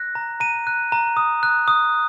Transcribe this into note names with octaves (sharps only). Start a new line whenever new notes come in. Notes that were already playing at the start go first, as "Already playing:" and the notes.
Already playing: F#6 A#6
A#5
A#5 D#7
F#6
A#5
D#6
F#6
D#6